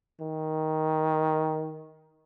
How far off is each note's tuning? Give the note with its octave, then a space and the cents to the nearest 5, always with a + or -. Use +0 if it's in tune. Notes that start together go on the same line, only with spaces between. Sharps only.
D#3 +10